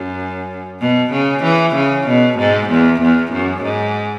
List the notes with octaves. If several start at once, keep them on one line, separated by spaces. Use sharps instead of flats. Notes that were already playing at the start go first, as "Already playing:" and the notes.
Already playing: F#2
B2
C#3
E3
C#3
B2
G#2
E2
E2
F#2
G#2